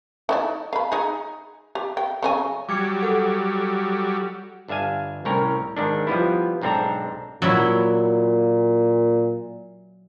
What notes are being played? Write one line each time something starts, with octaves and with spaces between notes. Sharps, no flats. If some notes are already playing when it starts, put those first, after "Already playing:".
D#4 E4 D5
F5 B5
D#4 G#4
G4
G5
C#3 F#3 G#5
F#3 G3 D6 G#6 C#7
A4 F#5
G1 D4 E5 F5 G#5
C2 A2 C4 C#4 A#4 C#5
G#2 D#3 D4
F3 G3 B3 E4
B1 G#2 C4 D4 A4 A#5
A#2 F#3 E4